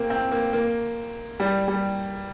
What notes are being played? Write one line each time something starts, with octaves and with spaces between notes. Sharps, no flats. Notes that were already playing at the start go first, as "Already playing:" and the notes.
Already playing: A#3 C4
C4
A#3
A#3
G3
G3